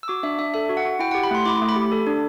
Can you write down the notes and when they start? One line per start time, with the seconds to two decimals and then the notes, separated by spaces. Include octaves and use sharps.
0.03 E6
0.08 F#4 D6
0.23 D4 E5
0.39 D4 E5
0.54 A4 E5
0.69 F#4
0.77 F#5
0.85 F#4
0.99 E4 G5
1.11 F#5
1.15 G4
1.23 B5
1.31 A3 C6
1.45 E4 D6
1.62 A3
1.69 B5
1.76 G4
1.92 A4
2.07 D4